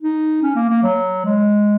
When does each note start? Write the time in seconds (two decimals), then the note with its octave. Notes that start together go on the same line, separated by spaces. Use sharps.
0.01 D#4
0.43 C#4
0.56 A#3
0.70 A#3
0.83 F#3
1.25 G#3